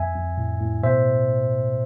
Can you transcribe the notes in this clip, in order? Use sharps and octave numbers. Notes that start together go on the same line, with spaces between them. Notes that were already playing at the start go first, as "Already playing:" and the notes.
Already playing: F2 E5 G#5
F2
A2
A2
B2 C5 E5